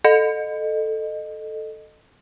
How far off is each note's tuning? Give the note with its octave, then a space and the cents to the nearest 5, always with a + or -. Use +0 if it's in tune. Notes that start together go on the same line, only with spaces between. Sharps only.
A4 +0 D#5 -20